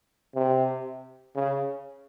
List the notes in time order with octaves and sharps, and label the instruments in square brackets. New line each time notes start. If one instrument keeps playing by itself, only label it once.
[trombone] C3
C#3